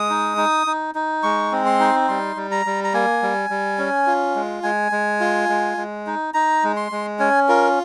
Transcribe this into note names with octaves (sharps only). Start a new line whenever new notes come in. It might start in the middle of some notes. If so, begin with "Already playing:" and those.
Already playing: G#3 D#6
D#4
D#4
D#4
D#4
G#3 C#6
C4
C6
D#4
G3 C6
G3
A#5
G3
A#5
A#3 G#5
G3
G3
C#4
F4
G#3
G#3 G#5
G#3
F4
G#3
G#3
D#4
D#4 A#5
G#3
C6
G#3
C#4 G#5
F4 A#4